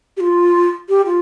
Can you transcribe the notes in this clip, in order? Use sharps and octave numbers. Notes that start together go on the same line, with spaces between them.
G4
F4
G4
F4